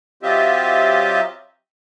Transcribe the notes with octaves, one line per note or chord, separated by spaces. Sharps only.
F#3 C4 F4 G4 D#5 E5